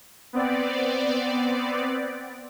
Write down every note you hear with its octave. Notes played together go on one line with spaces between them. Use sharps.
B3 C4 D5